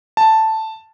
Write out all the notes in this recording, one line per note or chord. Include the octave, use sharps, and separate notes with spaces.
A5